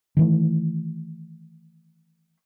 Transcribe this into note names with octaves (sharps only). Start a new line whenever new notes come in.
D#3 E3 A3